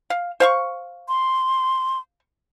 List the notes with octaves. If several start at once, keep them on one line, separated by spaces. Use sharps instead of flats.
F5
C5 F5 C#6
C6